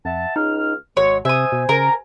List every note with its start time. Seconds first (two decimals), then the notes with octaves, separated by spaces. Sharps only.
0.05 F2 E5 F#5 A5
0.36 C#2 D#4 F6
0.97 G#1 F#3 G#3 C#5
1.25 C3 C5 E5 G#5 D#6
1.52 B2
1.69 C#3 A#4